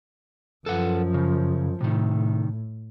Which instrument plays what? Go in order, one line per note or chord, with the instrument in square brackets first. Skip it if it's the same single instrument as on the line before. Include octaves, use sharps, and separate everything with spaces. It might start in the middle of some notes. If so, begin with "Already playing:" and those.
[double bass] F#2 F3 [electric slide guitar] A4 B4 F#5
[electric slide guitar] C#3
[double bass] A2 [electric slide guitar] C3 D#3